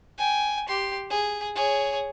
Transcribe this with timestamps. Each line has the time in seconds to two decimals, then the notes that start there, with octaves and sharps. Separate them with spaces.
0.18 G5 G#5
0.69 G4 C6
1.10 G#4
1.55 G#4 C#5